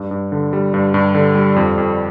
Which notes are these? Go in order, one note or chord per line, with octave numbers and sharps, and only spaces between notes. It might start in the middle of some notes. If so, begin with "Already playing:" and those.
Already playing: G2
G2
D3
G3
G2
G2
D3
G3
F2
F2